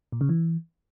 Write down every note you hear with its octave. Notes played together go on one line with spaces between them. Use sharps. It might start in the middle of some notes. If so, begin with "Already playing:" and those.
A#2
C#3
E3